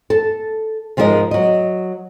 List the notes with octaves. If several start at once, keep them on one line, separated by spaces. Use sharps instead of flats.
A4 A5
G#2 F3 G#3 G4 A#4 D#5
F#3 D#5